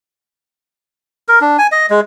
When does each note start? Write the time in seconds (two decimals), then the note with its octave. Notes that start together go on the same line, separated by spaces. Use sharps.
1.28 A#4
1.41 D4
1.58 G#5
1.72 D#5
1.90 G#3